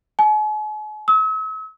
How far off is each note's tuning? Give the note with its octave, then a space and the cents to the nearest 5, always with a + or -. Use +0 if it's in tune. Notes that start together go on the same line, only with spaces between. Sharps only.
G#5 +45
E6 -45